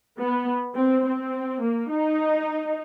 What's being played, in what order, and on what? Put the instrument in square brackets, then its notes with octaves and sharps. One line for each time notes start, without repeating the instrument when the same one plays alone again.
[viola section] B3
C4
C4
A#3
D#4